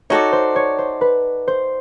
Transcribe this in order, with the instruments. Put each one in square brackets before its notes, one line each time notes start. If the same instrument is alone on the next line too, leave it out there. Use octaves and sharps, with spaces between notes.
[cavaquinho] D#4 F#4 A4 D5 [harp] C#5
[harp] C5
C#5
C5
B4
C5